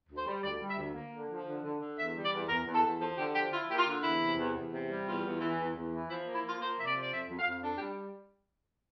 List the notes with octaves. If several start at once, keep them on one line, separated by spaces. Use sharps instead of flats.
D2
C5
G3
D2 D5
G3
E5
D2
A#3
D3
F3
D3
D3
D3
E2 E5
G3
D5
E2
E2 A#4
E2
A4
E2
F3 A4
D3 G4
F3 G4
E4 F4
A#3 G4
F4
D3
E2 E4
C3
E2
E2
C3
G3
E2 F4
E2
E3
E2
E2
E3
F3 E4
A#3
E4
F3 F4
A#3 C5
C3 E5
D5
F3
D5
F2 E5
F2
F5
F2
D4 A4
G4
G3